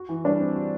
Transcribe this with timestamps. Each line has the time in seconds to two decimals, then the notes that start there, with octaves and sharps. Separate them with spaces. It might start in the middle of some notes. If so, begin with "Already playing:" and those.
Already playing: F#4
0.09 E3
0.24 G3 D4
0.40 C4
0.56 F#4